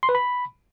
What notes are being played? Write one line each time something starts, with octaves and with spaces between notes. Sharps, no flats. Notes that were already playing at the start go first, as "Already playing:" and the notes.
C6
B4
B5